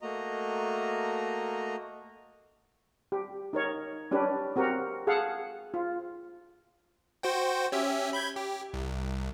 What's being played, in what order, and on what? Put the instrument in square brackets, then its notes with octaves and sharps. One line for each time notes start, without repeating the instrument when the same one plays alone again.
[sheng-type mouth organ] A3 A#3 F#4 D#5 A#5
[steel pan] G4
D#4 A#4 C#5
C#4 D4 G4 B4
C4 F#4 G4 A#4
G#4 A4 F5 F#5
F4
[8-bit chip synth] F#4 C5 G5
C#4 G4 E5
B5 G6 G#6
G4
C2